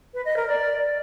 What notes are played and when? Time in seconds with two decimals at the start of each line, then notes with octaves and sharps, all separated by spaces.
0.14 B4
0.25 D#5
0.37 A#4
0.48 D5